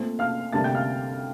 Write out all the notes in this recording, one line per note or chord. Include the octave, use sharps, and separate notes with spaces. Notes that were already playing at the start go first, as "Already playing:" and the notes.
Already playing: A#2 A3 C4
F5 F6
D2 C3 G3 A#3 A5 A6
G5 G6
F5 F6